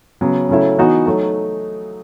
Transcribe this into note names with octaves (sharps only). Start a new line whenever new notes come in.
C#3 F#3 B3
C#3 F#3 A3 E4
E3 B3 D#4 F#4
F#3 A3 D#4